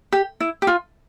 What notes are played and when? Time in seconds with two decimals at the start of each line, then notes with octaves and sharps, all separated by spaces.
0.12 G4
0.40 E4
0.62 G4
0.67 F4